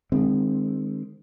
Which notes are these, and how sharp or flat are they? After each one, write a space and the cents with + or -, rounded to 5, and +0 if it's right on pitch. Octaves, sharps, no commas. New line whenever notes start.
D#3 -35 G#3 -20 C4 +0